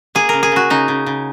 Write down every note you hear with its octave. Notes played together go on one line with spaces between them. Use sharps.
A#3 G#4
C#3 A#4
G#4
C#3 F#4
C#3 D#4
C#3
C#3